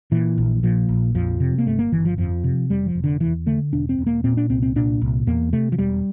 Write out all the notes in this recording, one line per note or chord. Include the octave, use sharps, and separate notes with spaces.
A#2 E3
A#1
A#2 F3
A#1
F2 F3
C3
A#3
G1 A3
A#3
G1 E3
F3
F2 F3
C3
F1 G3
F3
F1
D3
E2 E3
D3 A3
E1 D4
C4
E1
A#3
A#2 C4
D4
C2 C4
C4
A#2 D4
C2
E2 A#3
C3 A3
F3
E1 G3